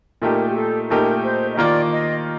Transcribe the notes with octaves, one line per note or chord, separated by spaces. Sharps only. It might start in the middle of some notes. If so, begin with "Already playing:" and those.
A#2 A3 D#4 G4 A#4
G4
A4
A#2 A3 D#4 G4 A#4
C5
D#5
D#3 A#3 F4 D5
D#5